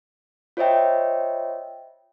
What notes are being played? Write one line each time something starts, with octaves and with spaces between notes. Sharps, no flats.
F4 C5 C#5 D#5 E5 G5